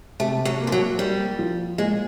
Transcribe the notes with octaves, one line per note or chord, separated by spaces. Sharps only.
C3 A3
F#3
A#3
F3
F#3
G3 A#3
F3
A#2 G#3